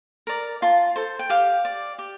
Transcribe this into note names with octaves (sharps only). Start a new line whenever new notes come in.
A#4 D5
F4 A5
A4 C5
G5
G4 F5
D5
G4